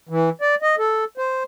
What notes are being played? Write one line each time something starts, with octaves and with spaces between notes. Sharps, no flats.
E3
D5
D#5
A4
C5